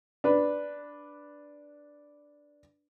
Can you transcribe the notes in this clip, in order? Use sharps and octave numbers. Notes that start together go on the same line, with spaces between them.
D4 B4